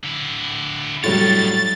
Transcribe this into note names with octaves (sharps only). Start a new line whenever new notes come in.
D3 E4
A2 D3 F#3 G3 C#5 A6